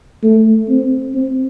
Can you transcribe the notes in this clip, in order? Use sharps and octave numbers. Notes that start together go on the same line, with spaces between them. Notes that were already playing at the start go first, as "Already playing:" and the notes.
A3
C4
C4